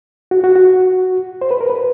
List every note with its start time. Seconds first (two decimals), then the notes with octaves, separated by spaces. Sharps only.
0.31 F#4
0.44 F#4
0.56 F#4
1.41 C5
1.51 B4
1.61 A#4
1.70 B4